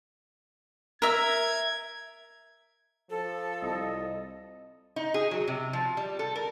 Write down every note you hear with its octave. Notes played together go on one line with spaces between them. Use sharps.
A#4 E5 G#6
F3 A4
C2 D#5
D#4
G#4
F#3
C3
F3
G3
A4
A#4